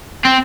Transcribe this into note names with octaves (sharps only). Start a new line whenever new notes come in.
C4